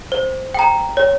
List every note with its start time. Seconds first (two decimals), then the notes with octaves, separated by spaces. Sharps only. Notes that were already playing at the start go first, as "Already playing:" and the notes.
0.12 C5
0.54 G5 A#5
0.97 C#5